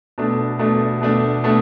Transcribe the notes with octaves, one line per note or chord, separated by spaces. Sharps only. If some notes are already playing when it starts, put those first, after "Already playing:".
B2 A3 D4
B2 A3 D4
B2 A3 D4
B2 A3 D4